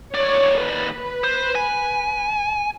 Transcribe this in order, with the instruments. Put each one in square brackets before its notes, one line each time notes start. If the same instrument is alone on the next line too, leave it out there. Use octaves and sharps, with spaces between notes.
[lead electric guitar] D#2 D5 [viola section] C#5
[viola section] B4
[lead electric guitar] C5
G#5